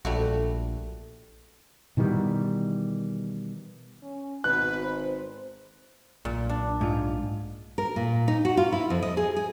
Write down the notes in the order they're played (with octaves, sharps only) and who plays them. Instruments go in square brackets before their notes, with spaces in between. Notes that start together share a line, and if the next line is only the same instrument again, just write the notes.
[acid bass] A#1 [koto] G3 A3 F#4
[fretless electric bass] B2 D#3 E3 G3
[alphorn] C#4
[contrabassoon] G#1 [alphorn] B2 [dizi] B4 [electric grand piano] F#6
[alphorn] C5
[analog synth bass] B1 [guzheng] A#2
[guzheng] D4
[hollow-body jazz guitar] G#2 F4
[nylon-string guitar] A#4
A#2
D#4
F#4
F4
E4
F2
D#5
G#4
G#4